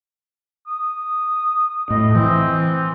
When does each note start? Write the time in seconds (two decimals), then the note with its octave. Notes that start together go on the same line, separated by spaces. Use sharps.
0.67 D#6
1.90 A2 D#5
2.15 E3 C4